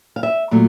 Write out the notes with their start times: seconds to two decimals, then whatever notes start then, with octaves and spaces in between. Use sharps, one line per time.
0.16 F5
0.23 E5
0.51 A#2 F#3 A3